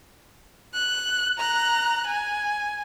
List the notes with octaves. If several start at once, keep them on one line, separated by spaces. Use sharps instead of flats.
F#6
A#5 F#6
G#5